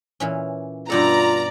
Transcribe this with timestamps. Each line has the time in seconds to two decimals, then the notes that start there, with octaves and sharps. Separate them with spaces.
0.20 A#2 E3 C#4
0.90 G2 B2 F4 A4 D5 A#5